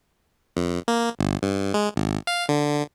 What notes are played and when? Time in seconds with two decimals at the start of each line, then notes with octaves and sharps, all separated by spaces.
0.57 F2
0.88 A#3
1.19 G1
1.42 G2
1.74 G#3
1.96 G#1
2.27 F5
2.49 D3